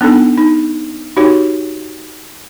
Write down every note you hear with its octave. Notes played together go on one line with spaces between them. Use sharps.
B3 D4 D#4 A4
D#4
D#4 F#4 G4 C#5